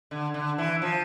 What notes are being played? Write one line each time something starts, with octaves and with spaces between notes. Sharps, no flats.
D3
D3
E3
F3